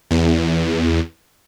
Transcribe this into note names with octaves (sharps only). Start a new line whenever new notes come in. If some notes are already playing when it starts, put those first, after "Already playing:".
E2